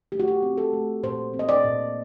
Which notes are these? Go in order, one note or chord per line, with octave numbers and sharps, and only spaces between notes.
A3 G4
F#4
G4
C4
A4
A3
A#2 C5
C4
D#5
D5
A#2